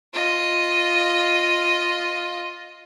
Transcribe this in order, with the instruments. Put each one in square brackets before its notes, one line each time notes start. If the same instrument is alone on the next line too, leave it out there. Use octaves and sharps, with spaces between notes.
[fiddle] F4 D#5